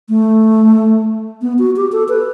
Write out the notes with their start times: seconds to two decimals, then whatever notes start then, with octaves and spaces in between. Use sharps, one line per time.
0.09 A3
1.42 B3
1.59 F#4
1.76 G4
1.92 A4
2.09 B4